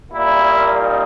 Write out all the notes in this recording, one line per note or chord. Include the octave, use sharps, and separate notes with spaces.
A#2 G3 A#3 E4
D#4